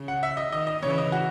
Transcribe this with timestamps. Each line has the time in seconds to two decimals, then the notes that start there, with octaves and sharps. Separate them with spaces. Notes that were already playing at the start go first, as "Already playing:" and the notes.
Already playing: C#3
0.08 F#5
0.23 E5
0.37 D#5
0.52 D#3 D#5
0.67 D#5
0.83 C#3 E3 C#5
0.98 D#5
1.12 F#4